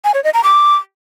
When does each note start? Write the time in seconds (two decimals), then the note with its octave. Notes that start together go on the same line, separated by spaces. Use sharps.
0.04 G#5
0.14 C#5
0.24 D#5
0.34 A#5
0.44 D6